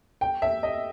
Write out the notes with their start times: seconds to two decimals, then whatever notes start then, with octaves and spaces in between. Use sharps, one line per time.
0.21 G5
0.42 E5
0.63 D#5